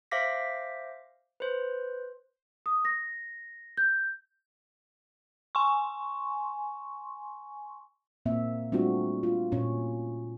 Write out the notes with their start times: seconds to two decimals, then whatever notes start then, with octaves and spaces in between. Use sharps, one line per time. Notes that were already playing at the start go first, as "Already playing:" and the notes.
0.11 C5 E5 F5 D6 A#6 B6
1.40 B4 C5
2.66 D#6
2.85 A#6
3.77 G6
5.55 G#5 C6 C#6
8.26 A#2 A#3 C4 E5
8.72 G3 A3 C4 D4 F4 F#4
9.23 F4
9.52 A#2 C#4 C#5